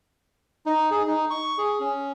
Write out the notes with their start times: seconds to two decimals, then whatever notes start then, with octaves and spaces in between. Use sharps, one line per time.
0.66 D#4
0.91 G#4
1.07 D#4
1.31 C#6
1.58 G#4
1.80 C#4